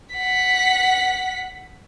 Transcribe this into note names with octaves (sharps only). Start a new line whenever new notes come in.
F#5 B6